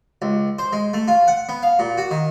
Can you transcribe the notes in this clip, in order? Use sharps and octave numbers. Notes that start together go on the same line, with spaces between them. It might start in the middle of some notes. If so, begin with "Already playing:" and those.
C#2
C5
G#3
A3
F4
F#5
B3
F5
A#2
F#4
D#3